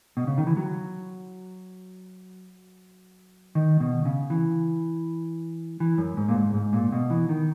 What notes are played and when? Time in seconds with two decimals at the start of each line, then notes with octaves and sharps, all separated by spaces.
0.17 B2
0.27 C#3
0.38 D#3
0.47 E3
0.57 F#3
3.55 D#3
3.80 B2
4.05 C#3
4.30 E3
5.80 E3
5.98 F#2
6.17 G#2
6.29 A#2
6.35 G#2
6.54 G#2
6.73 A#2
6.92 B2
7.10 E3
7.29 D#3